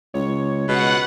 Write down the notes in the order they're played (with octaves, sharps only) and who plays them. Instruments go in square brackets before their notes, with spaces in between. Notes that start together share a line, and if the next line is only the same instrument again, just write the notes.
[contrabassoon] C#2 [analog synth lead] C#5
[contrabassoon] C#2 [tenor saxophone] B2 [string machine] F#5